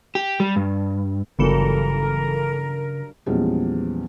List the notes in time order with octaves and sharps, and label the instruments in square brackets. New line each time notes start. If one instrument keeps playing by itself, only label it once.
[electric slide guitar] G4
G3
G2
[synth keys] G1 E3 A4 [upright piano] G2 F#3 [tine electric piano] C#3 [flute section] A#4
[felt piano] E2 A#2 F3 G3 G#3 C#4